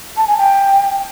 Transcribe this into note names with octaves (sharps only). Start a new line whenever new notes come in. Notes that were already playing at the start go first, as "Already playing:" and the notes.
A5
G#5
G5